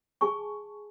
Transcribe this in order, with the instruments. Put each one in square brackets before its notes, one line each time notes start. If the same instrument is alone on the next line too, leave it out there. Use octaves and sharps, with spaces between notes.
[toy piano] G#4 G#5 A5 C#6